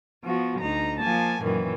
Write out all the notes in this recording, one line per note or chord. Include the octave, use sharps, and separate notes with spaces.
F3 B3 F#4
D2 D#4 A#5
F3 A#3 G#5 A5
F#2 A#2 D#3 E3